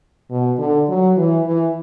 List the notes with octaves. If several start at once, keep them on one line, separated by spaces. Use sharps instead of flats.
B2
D3
F#3
E3
E3